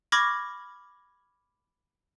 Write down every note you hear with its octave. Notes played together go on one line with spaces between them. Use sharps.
B5 C#6 D6 F6 G#6 A#6